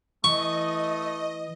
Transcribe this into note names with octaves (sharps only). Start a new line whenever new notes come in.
E3 A3 D#5 C#6